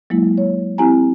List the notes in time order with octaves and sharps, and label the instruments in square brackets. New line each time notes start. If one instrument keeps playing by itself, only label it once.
[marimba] F#3 G#3 A#3 E4
C#5
C4 E4 G4 G#5 A#5